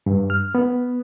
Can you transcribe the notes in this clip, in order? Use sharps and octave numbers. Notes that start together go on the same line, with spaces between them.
G2
F6
B3